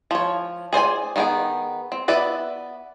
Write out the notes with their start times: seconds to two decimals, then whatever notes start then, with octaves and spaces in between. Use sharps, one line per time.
0.11 F3 C#5
0.73 G#4 C5 D5 G#5
1.16 D#3 G3 B3 G#4 G5
1.92 C4
2.08 B3 B4 D5 E5